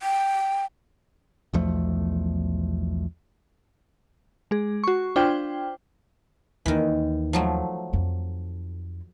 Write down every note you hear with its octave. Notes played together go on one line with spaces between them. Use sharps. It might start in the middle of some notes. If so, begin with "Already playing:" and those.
G5
B1 E2 F3 A3
G#3 G#4
F#4 C#6
D4 F4 C5 G5
D#2 D#3 E3
F3 F#3 A3
F2 D#4